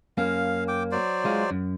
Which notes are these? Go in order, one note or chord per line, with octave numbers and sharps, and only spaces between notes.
F#2 A#3 C#4 F5
G5 D6
F#3 C5 D5
G#3 F4
F#2